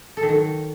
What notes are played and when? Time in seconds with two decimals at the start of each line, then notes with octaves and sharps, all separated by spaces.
0.17 A4
0.23 D#3
0.29 F#3